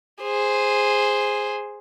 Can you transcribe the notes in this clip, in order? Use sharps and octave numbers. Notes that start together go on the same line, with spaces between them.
G#4 C5